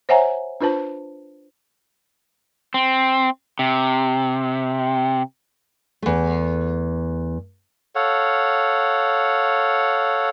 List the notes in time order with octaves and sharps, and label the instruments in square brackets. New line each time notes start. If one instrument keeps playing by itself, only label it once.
[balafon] C5 C#5 E5 F#5 G#5 A#5
D4 F4 B4 C5 A5
[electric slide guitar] C4
C3
[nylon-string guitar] E2 A3
[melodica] A4 C#5 F5 F#5